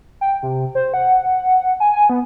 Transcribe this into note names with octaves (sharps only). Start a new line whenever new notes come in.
G5
C3
C5
F#5
G#5
G#5
B3